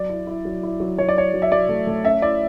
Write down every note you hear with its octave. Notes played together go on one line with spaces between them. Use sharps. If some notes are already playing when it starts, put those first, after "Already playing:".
Already playing: F#3 D5
E4
E4
F#3
E4
F#3
F#3 C#5
D5
E4 C#5
F#3
E5
F#3 D5
A3
A3
C#4 E5
E4 D5